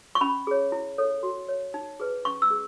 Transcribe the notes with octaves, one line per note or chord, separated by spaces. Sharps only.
C#6
C#4 B5
G#4 C#5
E4
A4 C#5
F#4
C#5
D#4
G#4 B4
C#4 C#6
E6
G#4